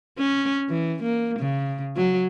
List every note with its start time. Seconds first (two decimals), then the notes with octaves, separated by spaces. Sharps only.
0.18 C#4
0.69 E3
1.03 A#3
1.39 C#3
1.96 F#3